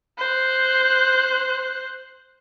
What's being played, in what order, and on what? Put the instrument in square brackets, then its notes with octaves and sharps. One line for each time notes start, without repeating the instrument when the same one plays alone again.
[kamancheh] C5 F#6